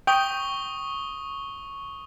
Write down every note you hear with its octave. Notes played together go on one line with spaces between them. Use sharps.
G5 C#6 D#6 G7